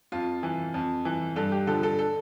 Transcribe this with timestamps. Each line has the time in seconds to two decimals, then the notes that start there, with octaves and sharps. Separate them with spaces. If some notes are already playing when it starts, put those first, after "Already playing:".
0.12 F2 F4
0.43 E3
0.74 F2
1.05 E3
1.36 G2 A4
1.52 G4
1.67 D3 F3 A4
1.83 A4
1.99 A4